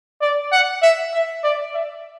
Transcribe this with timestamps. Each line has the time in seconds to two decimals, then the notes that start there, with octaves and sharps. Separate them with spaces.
0.21 D5
0.52 F#5
0.82 E5
1.13 E5
1.43 D5
1.74 E5